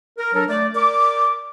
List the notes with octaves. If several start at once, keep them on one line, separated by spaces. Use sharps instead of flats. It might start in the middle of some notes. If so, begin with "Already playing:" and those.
A#4
F#3 D4 A4 A#4
A3 D5
A#4 D5 D6